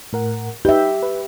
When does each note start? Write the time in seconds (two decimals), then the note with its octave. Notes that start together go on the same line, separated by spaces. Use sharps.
0.13 A2 A#4 F#5
0.65 D#4 G4 B4 E5 G6
1.03 B4